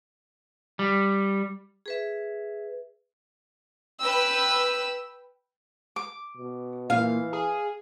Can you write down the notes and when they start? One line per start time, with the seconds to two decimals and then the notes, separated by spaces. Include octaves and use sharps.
0.79 G3
1.86 G#4 B4 E5
4.00 B4 G5 E6
5.96 D6
6.37 B2
6.90 A#2 E3 F5
7.33 G#4